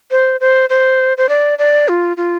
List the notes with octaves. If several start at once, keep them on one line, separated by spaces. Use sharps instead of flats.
C5
C5
C5
C5
D5
D5
F4
F4